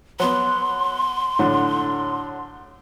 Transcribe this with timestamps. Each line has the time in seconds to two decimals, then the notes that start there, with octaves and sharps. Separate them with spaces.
0.20 F#3 B3 C6
1.39 A2 D3 F#3